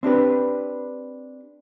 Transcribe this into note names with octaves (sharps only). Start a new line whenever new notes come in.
C4 D4 G4 B4